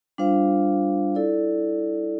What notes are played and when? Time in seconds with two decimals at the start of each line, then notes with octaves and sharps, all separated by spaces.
0.18 G3 D4 F4 C5 F5
1.15 E4 A4 D5